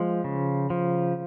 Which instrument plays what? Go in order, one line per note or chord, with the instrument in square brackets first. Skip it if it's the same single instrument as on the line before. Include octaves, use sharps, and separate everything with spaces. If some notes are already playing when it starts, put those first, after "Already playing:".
Already playing: [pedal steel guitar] F3 G#3
C#3
F3